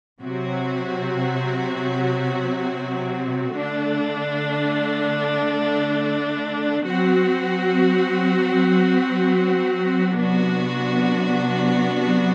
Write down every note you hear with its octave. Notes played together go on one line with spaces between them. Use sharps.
C3 F#3 C4 F#4
D3 A3 D4
F#3 C4 F#4
C3 F#3 B3 D4 F#4